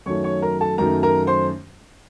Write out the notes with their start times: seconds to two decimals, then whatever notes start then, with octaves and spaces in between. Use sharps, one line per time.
0.06 F#2 D#3 F#3 A3 C#5 C#6
0.24 C#5 C#6
0.42 A#4 A#5
0.61 A4 A5
0.78 F#2 D#3 F#3 A3 A#4 A#5
1.03 A#4 A#5
1.27 C5 C6